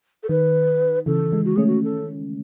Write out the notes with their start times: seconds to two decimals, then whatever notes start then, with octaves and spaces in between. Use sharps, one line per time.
0.23 A4
0.29 D#3 B4
1.06 C#3 E3 A4
1.32 E3 G#3
1.45 F#4
1.56 A3 C#4 G#4
1.67 F#4
1.84 A4